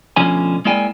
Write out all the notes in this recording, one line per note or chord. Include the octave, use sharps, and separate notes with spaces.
D2 B2 D3 F3 C#4 G#5
G#3 A#3 E4 D5 G5 G#5